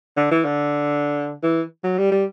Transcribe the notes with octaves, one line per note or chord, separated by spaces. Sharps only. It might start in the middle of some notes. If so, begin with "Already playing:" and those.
D3
E3
D3
E3
F#3
G3
G3